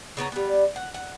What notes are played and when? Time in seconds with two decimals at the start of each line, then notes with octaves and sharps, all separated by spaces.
0.17 C#3 B3 C#5 A#5
0.32 G3 B3
0.76 F#5
0.94 F#5